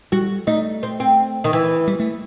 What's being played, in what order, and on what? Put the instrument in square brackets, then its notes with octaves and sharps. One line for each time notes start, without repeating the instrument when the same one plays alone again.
[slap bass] G3 [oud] F#4
[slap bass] A3 [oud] D#4
[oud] C4
C4
D#3
E3
[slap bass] G3
A3